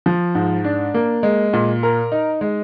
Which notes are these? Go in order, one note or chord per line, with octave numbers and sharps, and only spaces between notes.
F3
G#2
D4
A#3
G#3
A#2
A#4
D#4
G#3